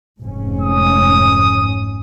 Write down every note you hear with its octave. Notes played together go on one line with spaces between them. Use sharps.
F1 G#2 C#4
D#6